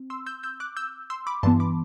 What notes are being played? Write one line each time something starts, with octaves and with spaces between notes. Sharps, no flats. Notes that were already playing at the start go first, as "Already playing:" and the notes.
Already playing: C4
C6 E6
E6 G6
E6 G6
D6 F#6
E6 G6
C6 E6
B5 D6
G2 E3 B3 A5 C6
B5 D6